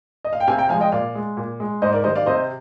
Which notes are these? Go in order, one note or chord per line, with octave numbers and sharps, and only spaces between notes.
D#5
F5
G5
C3 F5 G#5
G5 A#5
F3 G#3 F5 G#5
D#5 G5
A#2 D5 F5
G#3
A#2
G#3
G#2 C5 D#5
A#4 D5
D#3 G3 C5 D#5
D5 F5
C3 C5 D#5